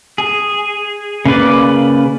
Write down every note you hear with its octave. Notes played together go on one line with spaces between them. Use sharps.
G#4
C#3 A#3 B4 D5